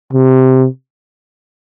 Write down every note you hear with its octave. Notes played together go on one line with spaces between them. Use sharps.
C3